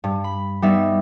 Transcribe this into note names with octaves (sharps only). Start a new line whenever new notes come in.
G2
B5
G3 B3 D#4 E5